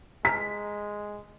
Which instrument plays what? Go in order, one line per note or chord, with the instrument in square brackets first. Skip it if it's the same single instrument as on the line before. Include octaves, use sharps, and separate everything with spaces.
[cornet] G#3 [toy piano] B4 A5 A#5 [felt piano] B6